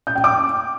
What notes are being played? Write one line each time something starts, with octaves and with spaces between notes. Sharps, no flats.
G6
G5
D6